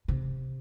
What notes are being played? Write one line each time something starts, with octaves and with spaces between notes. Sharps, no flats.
C3